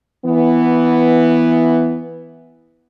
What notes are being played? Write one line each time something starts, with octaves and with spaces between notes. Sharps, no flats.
E3 B3